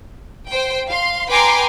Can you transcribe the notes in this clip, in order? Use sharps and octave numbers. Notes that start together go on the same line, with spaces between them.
C5 G5
F5 C6
B4 G5 G#5 A#5 C6 D6